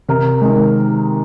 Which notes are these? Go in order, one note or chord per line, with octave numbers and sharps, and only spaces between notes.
C3 A#4
D#3 G#3